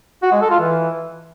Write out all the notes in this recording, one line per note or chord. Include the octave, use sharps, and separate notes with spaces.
F#4
G#3
A4
F4
E3